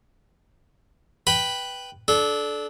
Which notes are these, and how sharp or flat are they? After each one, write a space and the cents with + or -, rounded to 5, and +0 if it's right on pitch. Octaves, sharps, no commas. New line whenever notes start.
B4 +0 G5 +0 B5 +0
D4 +0 A4 -25